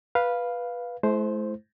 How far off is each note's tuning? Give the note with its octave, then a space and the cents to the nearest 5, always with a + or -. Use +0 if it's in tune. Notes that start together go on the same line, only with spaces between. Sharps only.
B4 -10 F5 +0
A3 -45 E4 +0 C5 +0